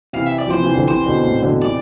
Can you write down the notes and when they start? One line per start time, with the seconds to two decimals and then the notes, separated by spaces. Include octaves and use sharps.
0.13 C3 E3 F5
0.26 E5
0.38 D5
0.46 F3
0.51 C3 E3 C5
0.63 C3 E3
0.75 D3 F3
0.88 C3 E3 C5
1.06 B2 D3
1.24 A2 C3
1.43 B2 D3
1.62 C3 E3 D5